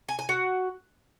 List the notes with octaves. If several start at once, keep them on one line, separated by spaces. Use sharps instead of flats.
G#5
G#5
F#4